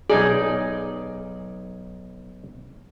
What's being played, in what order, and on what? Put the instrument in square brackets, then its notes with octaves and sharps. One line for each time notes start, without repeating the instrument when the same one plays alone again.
[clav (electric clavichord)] B1 D#4 D5 [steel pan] G#4